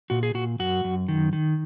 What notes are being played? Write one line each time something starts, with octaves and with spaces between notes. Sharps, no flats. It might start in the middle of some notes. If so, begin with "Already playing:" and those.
A#2 F#4
G#4
A#2 F#4
F#2 F#4
F#2
D#3
D#3